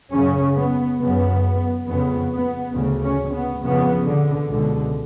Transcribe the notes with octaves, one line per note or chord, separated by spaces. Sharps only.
F#2 C#3 C#4
B3
F#2 C#3 B3
F2 C#3 B3
B3
D2 C#3
C#4
B3
F2 C#3 B3
D3
C#2 B2 D3